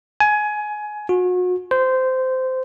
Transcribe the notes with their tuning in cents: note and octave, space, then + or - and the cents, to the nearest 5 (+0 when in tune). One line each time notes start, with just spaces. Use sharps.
G#5 +20
F#4 -35
C5 -15